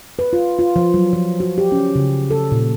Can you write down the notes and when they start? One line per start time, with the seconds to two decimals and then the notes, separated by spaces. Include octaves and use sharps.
0.19 B4
0.33 F4
0.59 F4
0.76 F3
0.94 F#3
1.13 F3
1.40 F#4
1.58 G4
1.72 C#4
1.96 C#3
2.31 A4
2.52 A#2